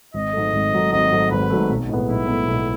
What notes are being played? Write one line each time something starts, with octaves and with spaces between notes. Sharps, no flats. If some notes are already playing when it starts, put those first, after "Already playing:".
G#1 D#5
G#2 F#3 A3
G#1
G#2 F#3 A3
G#1 D#5
G#2 F#3 A3
G#1 B4
G#2 F#3 A3
B1
A2 G#3 B3
B1 E4
A2 G#3 B3
B1